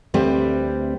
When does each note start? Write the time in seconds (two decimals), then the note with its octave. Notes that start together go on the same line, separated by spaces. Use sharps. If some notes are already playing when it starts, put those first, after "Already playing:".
0.14 D2 G3 C4 B4 E5